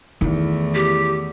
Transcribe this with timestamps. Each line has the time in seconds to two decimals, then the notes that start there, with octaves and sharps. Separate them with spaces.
0.21 E2 D#3 A3 E4
0.75 G4